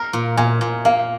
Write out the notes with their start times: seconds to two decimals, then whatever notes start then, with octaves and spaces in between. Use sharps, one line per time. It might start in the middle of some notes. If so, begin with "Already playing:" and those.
Already playing: A#4 A#5
0.13 A#2
0.37 A#2 G#5
0.61 A#2
0.85 A#3 F5